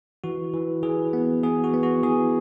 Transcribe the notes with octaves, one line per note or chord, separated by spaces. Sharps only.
E3 F#4
E3
E3 G#4
B3
B3 G#4
F#4
B3
F#4
E3 G#4